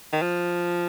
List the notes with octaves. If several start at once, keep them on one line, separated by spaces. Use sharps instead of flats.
D#3
F3